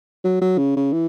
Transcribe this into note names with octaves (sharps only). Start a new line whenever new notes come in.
F#3
F#3
C#3
C#3
E3